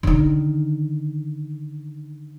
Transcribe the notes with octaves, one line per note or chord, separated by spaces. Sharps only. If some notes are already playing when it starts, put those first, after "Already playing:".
D3 D#3